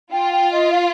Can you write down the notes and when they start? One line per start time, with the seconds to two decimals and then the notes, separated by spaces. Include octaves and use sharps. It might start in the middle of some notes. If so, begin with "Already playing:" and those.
0.12 F4 G5
0.32 G5
0.51 D#5
0.72 F5